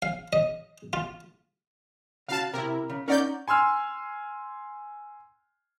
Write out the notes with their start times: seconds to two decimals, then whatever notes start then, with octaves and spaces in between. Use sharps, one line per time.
0.02 F5
0.33 D#5
0.93 F4
2.28 C#3 F#4 F5 A5
2.54 C3 E4 A#4
2.90 C#3
3.08 C#4 D#4 A#4 D5 F#5 G6
3.48 G#5 C6 E6 F6